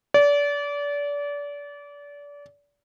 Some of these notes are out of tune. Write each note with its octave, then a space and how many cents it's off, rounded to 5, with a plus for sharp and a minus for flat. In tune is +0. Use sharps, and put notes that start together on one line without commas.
D5 -30